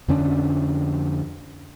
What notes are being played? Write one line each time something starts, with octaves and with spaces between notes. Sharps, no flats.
F2 D3 C#4 D4